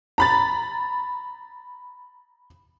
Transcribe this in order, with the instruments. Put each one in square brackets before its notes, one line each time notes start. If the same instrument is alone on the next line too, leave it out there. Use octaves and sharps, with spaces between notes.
[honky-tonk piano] A#5 B5 A6